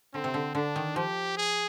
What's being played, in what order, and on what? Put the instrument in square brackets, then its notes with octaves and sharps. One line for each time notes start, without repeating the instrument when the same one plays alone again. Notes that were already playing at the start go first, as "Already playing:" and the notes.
[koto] D3 [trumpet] C4
[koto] C3
D3
[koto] D3 [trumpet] D4
[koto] D#3
[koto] F3 [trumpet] G4
[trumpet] G#4